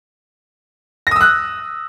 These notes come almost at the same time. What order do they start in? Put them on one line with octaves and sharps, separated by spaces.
A#6 D#6 E6 F#6